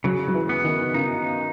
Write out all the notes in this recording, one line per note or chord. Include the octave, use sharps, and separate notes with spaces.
C#3 F#3
F#3
E3
B3
D#3
C#3 D#4